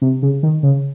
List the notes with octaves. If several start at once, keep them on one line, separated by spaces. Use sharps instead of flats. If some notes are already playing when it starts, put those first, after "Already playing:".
C3
C#3
D#3
C#3